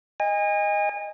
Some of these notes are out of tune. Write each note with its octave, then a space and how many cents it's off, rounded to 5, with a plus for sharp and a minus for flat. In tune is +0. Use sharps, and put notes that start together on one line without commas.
D#5 +0 G#5 -35